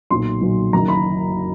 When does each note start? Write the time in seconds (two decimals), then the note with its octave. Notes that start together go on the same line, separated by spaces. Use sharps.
0.11 B1 A#2 F#3 C6
0.41 B1 A#2 F#3
0.73 F#1 F#2 D#3 F#3 A#5
0.88 B5